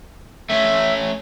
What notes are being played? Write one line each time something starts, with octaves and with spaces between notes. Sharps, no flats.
A3 C#4 E5